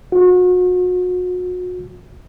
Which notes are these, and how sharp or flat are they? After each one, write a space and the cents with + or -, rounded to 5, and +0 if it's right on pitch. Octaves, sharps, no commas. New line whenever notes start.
F#4 -35